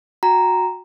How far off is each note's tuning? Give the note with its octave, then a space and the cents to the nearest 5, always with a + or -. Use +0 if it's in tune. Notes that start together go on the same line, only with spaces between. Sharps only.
F#4 -20 G5 +0 A#5 +0